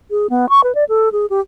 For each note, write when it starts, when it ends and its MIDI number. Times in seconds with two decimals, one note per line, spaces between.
0.11 0.27 68
0.30 0.49 59
0.49 0.63 85
0.64 0.75 71
0.75 0.84 74
0.89 1.09 69
1.12 1.26 68
1.30 1.40 67